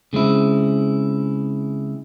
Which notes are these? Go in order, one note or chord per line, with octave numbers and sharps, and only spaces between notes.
C#3 G#3 C4 E4